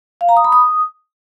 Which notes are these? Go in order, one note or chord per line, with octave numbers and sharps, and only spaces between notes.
F5
A#5
D#6
B5
D#6